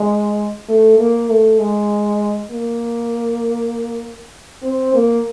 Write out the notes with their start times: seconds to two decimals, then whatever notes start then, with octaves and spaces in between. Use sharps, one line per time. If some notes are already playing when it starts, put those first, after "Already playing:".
Already playing: G#3
0.69 A3
0.99 A#3
1.30 A3
1.60 G#3
2.51 A#3
4.63 C4
4.94 A#3